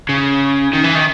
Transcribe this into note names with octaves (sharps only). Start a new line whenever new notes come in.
C#3
D#3
E3
D#3